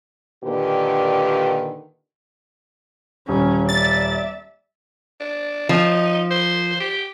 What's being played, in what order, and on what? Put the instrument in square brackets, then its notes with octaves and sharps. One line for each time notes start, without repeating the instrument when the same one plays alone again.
[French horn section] A#2 D3 D#3 G4 B4
[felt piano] D#1 [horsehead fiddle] C#4
[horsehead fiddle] D5 E5 [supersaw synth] A6
[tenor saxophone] D4
[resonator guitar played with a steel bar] F3 [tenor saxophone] D#4
[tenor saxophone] C5
G4